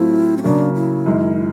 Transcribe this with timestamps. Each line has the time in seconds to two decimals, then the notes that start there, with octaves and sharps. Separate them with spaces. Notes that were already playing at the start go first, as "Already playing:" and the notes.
Already playing: A2 F#3 A3 C4 E4 F4
0.37 C#4
0.43 C#3 F#3 A#3 D4
0.74 E4
1.06 F#2 D#3 G#3